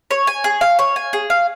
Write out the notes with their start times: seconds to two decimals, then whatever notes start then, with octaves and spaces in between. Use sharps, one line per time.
0.11 C#5
0.27 G#5
0.44 G#4
0.61 F5
0.79 C#5
0.96 G#5
1.13 G#4
1.30 F5